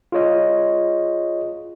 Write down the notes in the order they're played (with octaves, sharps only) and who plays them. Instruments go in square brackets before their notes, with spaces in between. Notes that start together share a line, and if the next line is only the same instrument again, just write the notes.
[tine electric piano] F4 G#4 C#5 D#5